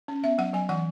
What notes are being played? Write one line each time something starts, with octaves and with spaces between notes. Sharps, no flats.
C#4
B3 E5
F#3 F#5
F#3 G#5
E3 F#5